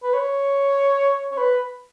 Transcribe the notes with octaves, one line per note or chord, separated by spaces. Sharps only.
B4
C#5
C#5
B4